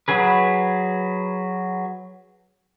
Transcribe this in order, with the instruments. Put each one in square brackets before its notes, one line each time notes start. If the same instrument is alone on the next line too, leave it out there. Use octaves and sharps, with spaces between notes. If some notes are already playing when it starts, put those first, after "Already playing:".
[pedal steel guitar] F#3 G#4 B4